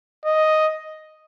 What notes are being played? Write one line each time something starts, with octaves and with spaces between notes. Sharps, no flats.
D#5